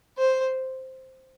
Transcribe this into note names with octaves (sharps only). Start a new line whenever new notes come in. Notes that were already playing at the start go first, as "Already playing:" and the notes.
C5